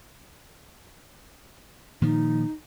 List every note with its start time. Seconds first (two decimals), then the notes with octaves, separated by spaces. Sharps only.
2.02 A#2 D#3 F3 D#4